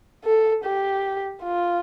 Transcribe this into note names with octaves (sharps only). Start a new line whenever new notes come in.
A4
G4
F4